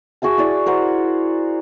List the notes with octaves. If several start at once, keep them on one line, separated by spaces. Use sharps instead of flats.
F#4 G#4 E5 A5
E4 F#4 D5
F#4 A#4 C5 F#5